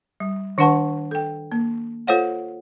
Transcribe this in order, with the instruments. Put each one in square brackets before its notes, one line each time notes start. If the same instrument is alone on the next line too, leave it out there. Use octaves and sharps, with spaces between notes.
[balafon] G3
D#3 D4 B4 F#5 A5 C#6
A4 G5
A#3
F4 A4 C5 C#5 F5 F#5